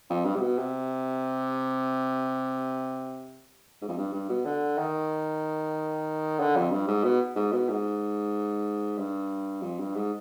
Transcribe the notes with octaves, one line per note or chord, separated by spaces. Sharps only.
F2
G2
C3
B2
C3
G#2
F2
G2
G2
B2
D3
D#3
D3
F2
G2
G#2
B2
G#2
B2
G#2
G2
F2
G2
G#2